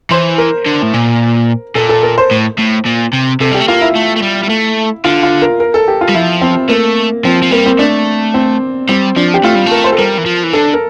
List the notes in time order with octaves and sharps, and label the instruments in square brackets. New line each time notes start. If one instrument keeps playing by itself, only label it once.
[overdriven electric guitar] E3 [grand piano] C5
[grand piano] A#4
[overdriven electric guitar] D3
A2
A#2
[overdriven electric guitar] A#2 [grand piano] A4
[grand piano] A4
A#4
C5
[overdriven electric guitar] A2
A2
A#2
C3
[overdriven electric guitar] C3 [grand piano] A4
[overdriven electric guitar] G3 [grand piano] G4
[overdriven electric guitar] A3
[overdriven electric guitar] A#3 [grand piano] F4
[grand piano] E4
[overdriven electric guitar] A3
A3
G3
G3
A3
[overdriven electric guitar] D3 [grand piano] F4
[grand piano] F4
A#4
A#4
A4
G4
F4
[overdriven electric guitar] G3
[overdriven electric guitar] F3 [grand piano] E4
[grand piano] C4
[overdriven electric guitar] A3 [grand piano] A#3
[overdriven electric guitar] F3 [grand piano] C4
[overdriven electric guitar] F3
[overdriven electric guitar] G3 [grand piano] A#3
[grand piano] C4
[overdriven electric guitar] A3 [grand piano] D4
[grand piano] C4
[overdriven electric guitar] G3 [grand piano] C4
[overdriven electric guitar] F3 [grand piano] D4
[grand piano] G4
[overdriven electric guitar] A3 [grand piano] F4
[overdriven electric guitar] G3
A3
[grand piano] A#4
C5
A4
[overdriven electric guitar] G3 [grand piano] A#4
[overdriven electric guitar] E3
F3
E3
[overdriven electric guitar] D3 [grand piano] A4
[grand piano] A#4